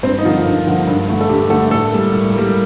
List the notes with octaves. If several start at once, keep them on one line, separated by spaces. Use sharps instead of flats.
G2 C4
D#4
D3 F3 A#3 F4
G2
D3 F3 A#3
G2
D3 A3
A4
G2 G4
D3 A3 A4
A2 A4
G3 A#3
A2
G3 A#3